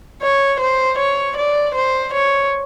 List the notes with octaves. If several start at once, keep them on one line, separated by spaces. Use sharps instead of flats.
C#5
C5
C#5
D5
C5
C#5